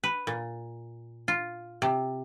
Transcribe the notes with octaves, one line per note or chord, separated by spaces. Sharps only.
B4
A#2
F4
C3